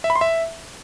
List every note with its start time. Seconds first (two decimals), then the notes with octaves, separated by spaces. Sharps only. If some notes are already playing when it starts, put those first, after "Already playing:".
0.04 E5
0.10 B5
0.16 C6
0.21 E5